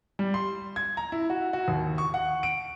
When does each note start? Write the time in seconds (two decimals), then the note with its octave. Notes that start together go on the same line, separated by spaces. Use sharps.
0.19 G3
0.34 C6
0.76 G#6
0.97 A#5
1.12 E4
1.30 F#4
1.53 F#4
1.68 D#2
1.98 C#6
2.14 F#5
2.43 D7